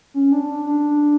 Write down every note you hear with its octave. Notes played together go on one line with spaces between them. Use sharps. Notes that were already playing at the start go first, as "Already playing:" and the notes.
C#4
D4
D4